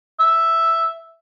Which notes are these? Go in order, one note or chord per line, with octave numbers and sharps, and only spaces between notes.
E5